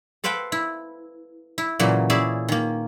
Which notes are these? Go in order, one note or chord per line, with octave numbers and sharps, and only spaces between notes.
A4 B4 C5 F5 G5
E4
E4
A#2 C#3 E3 F#3 A#3
C#4 E4 G#4 D5 E5
D#3 A#3